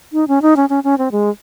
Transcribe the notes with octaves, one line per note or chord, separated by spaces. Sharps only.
D#4
C#4
D#4
C#4
C#4
C#4
C4
G#3